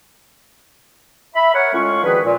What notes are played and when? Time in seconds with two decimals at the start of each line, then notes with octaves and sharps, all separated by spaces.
1.35 E5 B5
1.54 A#4 C#5 F#5
1.74 A2 G#3 C#4 F4 F5 C#6
2.03 D3 D#3 F3 F#4 G#4 B4
2.24 A#2